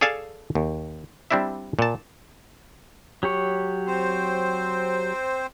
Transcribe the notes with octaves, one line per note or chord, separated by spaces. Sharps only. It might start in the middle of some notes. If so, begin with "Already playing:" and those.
G#4 A4 D5 F5 G#5 A5
D#2
G3 C4 D4 E4 E5
A#2 A5
F#3 G4 C#5
C4 C5